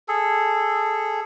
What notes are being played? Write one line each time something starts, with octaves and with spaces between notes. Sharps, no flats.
G#4 A4